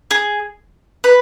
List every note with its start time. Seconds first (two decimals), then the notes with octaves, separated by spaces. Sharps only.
0.11 G#4
1.04 B4